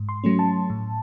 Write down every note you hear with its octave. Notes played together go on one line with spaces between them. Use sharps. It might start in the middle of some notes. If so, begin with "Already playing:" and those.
Already playing: G#2
C6
F#3 A3 C#4
A5
A2